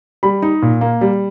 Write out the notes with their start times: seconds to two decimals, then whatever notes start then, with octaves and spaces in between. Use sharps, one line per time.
0.23 G3 B5
0.42 D#4
0.62 A#2
0.81 A#3
1.01 G3